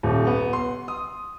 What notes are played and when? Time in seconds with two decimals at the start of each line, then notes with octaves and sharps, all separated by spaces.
0.03 D#1
0.27 B3
0.53 C6
0.88 D#6